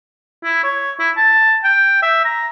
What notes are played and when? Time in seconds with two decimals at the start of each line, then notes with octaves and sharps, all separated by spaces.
0.43 E4
0.64 C#5
1.00 E4
1.17 A5
1.64 G5
2.03 E5
2.25 A#5